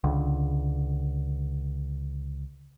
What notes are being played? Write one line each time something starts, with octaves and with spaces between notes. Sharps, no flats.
C#2 D3